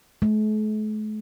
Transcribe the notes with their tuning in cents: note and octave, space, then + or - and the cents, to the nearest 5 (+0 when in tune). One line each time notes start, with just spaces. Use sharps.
A3 -45